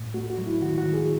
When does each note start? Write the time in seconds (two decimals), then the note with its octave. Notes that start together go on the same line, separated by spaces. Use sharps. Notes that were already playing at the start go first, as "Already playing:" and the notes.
Already playing: A2
0.14 A3 F#4
0.30 F#4
0.38 F#3
0.47 E4
0.62 D#3 F#4
0.78 F#4
0.86 D#3
0.94 G#4